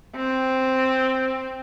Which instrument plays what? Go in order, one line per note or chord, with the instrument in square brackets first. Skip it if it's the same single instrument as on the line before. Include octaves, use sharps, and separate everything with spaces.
[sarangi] C4